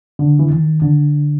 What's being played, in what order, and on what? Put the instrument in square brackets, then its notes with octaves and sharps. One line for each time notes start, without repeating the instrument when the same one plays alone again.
[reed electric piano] D3
E3
D#3
D3